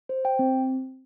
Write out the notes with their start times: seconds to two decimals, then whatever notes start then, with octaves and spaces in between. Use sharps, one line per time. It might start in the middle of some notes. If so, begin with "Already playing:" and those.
0.09 C5
0.25 G5
0.39 C4